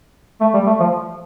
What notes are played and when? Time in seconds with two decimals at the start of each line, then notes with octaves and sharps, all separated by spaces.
0.41 A3
0.54 G3
0.66 A3
0.80 F3